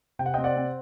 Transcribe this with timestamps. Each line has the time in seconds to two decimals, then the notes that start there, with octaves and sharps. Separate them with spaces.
0.19 C3 G5
0.26 F#5
0.34 C4 D#5 G5
0.44 D5 F#5
0.56 C4